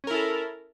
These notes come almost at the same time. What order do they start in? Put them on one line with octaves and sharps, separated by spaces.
C#4 A#4 E4 A4